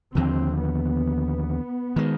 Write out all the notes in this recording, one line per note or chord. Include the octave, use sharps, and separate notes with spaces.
D#2 D3 F3 C4
B3
D#3 G#3